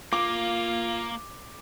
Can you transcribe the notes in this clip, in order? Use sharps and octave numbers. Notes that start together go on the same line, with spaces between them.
A#3 F4 D6